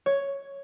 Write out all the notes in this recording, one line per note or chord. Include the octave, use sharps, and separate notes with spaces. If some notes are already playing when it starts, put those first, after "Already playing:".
C#5